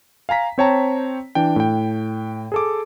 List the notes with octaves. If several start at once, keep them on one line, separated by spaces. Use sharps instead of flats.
F5 G#5 A#5 B6
C4 C5 C#5 G5 A5 A#5
E3 D4 G5
A2 G5
G#4 A4 D6